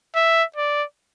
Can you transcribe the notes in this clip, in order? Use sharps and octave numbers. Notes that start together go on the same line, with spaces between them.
E5
D5